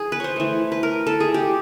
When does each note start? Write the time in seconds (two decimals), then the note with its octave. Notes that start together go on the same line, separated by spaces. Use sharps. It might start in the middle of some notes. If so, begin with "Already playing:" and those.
Already playing: E3 G#4
0.12 B4
0.20 C5 C#5
0.36 E3 A3
0.72 B4
0.83 A#4
1.07 A4
1.20 G#4
1.34 G4